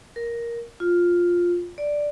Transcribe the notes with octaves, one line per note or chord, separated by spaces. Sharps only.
A#4
F4
D5